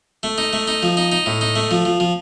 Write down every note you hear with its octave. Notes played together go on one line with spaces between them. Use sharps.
A3
D#4
A3
D#4
F3
D#4
D#4
A2
D#4
A3
F3
F3
F3